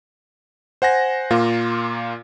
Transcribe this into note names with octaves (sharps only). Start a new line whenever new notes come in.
C5 F#5 G#5 A#6
A#2 A#3 F4